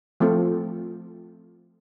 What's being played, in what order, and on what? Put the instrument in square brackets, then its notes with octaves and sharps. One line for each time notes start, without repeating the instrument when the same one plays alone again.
[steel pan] F3 A3 C4 F4 A4